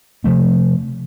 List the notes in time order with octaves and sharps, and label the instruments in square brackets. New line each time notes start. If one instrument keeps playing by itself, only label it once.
[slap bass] C3 F3 A3 C4